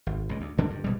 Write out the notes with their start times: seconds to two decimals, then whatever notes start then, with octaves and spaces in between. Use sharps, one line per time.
0.07 G#1
0.29 C#2 A#2
0.41 D2
0.58 D2 D3 D4
0.70 G2
0.84 A#1 B2 G3